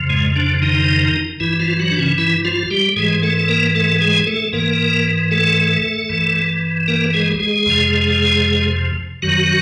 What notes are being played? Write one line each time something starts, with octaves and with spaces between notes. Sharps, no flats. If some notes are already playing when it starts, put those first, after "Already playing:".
Already playing: F2 C#3 F3
G#2 G#3
D3 D4
D#3 D#4
G2 E3 E4
F3 F4
F#3 F#4
D4
C#3 C#4
E3 E4
F3 F4
G3 G4
G#2 E3 G#3 G#4
A3 A4
A4
A#3 A#4
A3 A4
G#3 G#4
A3 A4
G#2 E3 A#3 A#4
A3 A4
G2 E3
A#3 A#4
G#3 G#4
G#3 G#4
F2 C3 F3
F#2 D#3 F#3 F#4